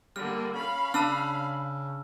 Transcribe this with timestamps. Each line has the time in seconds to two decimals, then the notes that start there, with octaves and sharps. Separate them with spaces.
0.16 D3 G3 A#3 F6
0.55 C#4 F5 B5
0.94 C#3 D4 A5 E6 F6